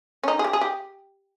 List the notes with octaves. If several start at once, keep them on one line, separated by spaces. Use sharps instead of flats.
C#4
D#4
G#4
G4
G#4
G4